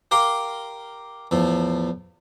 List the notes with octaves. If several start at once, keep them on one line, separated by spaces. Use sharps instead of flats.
G4 A#4 F5 C6 D6
E2 A2 F3